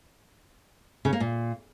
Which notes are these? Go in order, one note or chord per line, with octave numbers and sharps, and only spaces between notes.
C#3
A#3
A#2